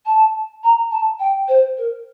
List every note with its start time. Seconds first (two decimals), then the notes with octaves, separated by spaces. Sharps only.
0.06 A5
0.63 A#5
0.91 A5
1.19 G5
1.48 C5
1.77 A#4